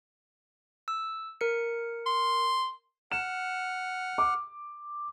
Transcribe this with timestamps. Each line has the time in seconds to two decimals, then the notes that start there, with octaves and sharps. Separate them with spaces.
0.88 E6
1.41 A#4 C#7
2.06 C6
3.12 F#5 F6 E7
4.18 D6